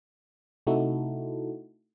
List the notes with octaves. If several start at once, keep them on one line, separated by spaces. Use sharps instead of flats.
C3 A3 D#4 E4 F#4 A4